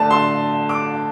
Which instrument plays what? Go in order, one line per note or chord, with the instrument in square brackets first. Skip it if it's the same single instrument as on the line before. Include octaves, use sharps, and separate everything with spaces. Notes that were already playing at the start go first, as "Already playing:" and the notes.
Already playing: [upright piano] D3 A3 D4 A5
C6
D6